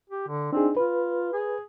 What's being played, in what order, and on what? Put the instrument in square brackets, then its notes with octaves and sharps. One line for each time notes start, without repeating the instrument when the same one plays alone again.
[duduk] G4
D3
[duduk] C4 [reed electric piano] D4 D#4 G#4
[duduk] F4 [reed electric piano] B4
[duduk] G#4